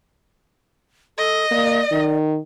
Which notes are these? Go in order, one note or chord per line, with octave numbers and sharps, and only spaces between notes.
A4 D#5
A#3 D5
D#3